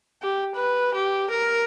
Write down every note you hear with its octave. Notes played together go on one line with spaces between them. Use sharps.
G4
B4
G4
A#4